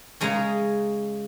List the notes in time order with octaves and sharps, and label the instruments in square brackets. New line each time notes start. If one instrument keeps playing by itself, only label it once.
[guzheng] C#3 G#3 C#4 A#5